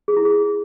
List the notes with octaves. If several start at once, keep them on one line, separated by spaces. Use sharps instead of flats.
G#4
E4
G#4